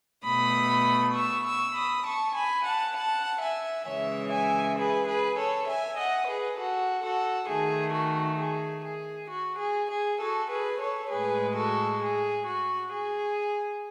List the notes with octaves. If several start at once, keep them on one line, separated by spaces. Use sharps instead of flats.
B2 A3 B5 D#6
C#6 E6
C#6 E6
B5 D#6
A5 C#6
G#5 B5
F#5 A5
F#5 A5
E5 G#5
C#3 E3 G#3 C#5 E5
E5 G#5
G#4 B4
G#4 B4
A4 C#5
E5 G#5
D#5 F#5
G#4 B4
F#4 A4
F#4 A4
D#3 A3 G#4
F#4
G#4
G#4
F#4
G#4
G#4
F#4 A4
G#4 B4
A4 C#5
A2 G#3 G#4 B4
F#4 A4
G#4
F#4
G#4